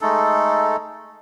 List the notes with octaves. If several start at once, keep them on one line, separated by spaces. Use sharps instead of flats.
G#3 A3 D#4 A4